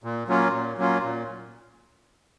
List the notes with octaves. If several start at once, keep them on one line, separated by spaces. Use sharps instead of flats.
A#2
F#3 A#3 C#4 F4
A#2
F#3 A#3 C#4 F4
A#2